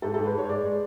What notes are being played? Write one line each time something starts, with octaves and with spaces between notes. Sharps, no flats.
G#2 A4
G#2 A4
B4
G#2 C#5
C#5
G#3 D5
G#3